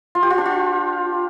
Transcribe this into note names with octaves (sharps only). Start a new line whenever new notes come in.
F4
G4
F4
D4
F4